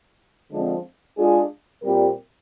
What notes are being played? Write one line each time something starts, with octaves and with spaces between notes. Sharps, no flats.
D3 F3 G#3 C4
G#3 D4 F4 G#4
A#2 G3 C4 G4 A#4